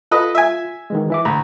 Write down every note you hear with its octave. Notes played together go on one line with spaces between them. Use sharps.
F4 A4 B4 D#5
E5 G#5
D#3 E3 G#3
E3 E5 D6
D2 A2 A#5 B5